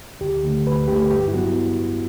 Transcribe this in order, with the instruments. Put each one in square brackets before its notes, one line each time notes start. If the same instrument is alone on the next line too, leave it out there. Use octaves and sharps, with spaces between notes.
[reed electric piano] D2 G4
D3 A3
D2 B4
D3 A3 G4
G2 G4
E4
F#3 B3 F#4